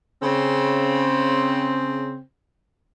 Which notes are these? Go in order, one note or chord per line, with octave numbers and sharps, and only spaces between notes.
C#3 C4